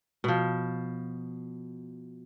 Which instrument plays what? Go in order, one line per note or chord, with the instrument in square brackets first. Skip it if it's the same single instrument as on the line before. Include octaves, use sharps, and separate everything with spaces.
[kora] B2 F3